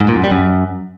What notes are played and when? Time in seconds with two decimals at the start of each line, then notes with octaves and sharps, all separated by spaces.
0.01 G#2
0.08 A#2
0.16 F#2
0.24 G3
0.31 F#2